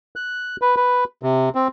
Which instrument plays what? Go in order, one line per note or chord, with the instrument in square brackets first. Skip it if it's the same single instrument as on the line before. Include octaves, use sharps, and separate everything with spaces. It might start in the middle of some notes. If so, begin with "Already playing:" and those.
[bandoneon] F#6
B4
B4
C3
C4